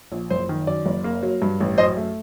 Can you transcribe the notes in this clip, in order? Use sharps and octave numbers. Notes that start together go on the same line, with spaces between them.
A#1
F#1 C5
D#3
F#2 D5
F#1
A#3
F#3
G2
A1
F#2 C5 D#5
A3